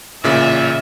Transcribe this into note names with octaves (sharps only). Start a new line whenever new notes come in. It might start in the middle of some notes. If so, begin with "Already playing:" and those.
A1 A#2 C#3 E5